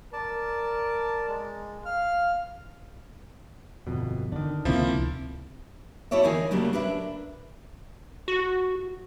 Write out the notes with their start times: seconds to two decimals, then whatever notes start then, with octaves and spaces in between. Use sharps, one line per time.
0.13 A#4 D5 A5
1.28 G#3
1.86 F5 F6
3.87 G1 F2 B2
4.32 D3 D#3 D4
4.65 C#2 C3 F3 A#3 C4 E4
6.11 E4 F#4 A4 C#5 D5 E5
6.23 D3 E3 D#4 G#4 A#4 G#5
6.51 C#3 F#3 G3 A3 A#3 D4
6.73 D4 A#4 B4 E5
8.28 F#4